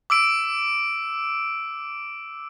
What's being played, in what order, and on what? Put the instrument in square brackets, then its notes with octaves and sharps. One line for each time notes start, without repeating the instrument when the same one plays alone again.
[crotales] D6 E6 D7